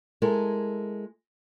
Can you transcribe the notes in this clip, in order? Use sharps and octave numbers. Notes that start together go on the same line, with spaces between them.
G#3 E4 A4 A#4